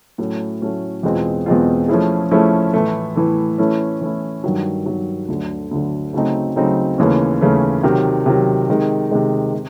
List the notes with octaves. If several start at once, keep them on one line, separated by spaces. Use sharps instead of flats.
A2 F#3 A3 C#4
A2 F#3 A3 C#4
E2 B2 G#3 C4 F4
E2 B2 G#3 C4 F4
F3 A3 C#4 E4 G#4
F3 A3 C#4 E4 G#4
A2 E3 A3
A2 E3 A3
E3 A3 C#4 E4
E3 A3 C#4 E4
G2 D#3 F#3
G2 D#3 F#3
D2 D3 F#3
D2 D3 F#3
C#3 F#3 A3 C4 D#4
C#3 F#3 A3 C4 D#4
D#2 C#3 E3 A3 C#4
D#2 C#3 E3 A3 C#4
C3 D#3 F#3
C3 D#3 F#3
C3 D#3 G#3
C3 D#3 G#3
C3